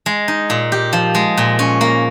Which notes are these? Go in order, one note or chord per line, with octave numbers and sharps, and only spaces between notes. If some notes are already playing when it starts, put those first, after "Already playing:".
G#3
D#4
A#2
G4
F3
G#3
A#2
C#4
A#3